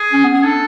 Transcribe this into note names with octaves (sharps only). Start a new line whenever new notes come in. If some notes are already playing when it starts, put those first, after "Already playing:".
Already playing: G#4
C#4
B3
C#4 G#4
D4 A4